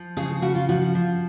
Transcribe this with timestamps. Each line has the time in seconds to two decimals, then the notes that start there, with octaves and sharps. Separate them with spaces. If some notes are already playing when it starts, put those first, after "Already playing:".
Already playing: F3
0.17 C#3 G#4
0.42 C#3 F#4
0.55 F4
0.69 F3 F#4
0.95 F3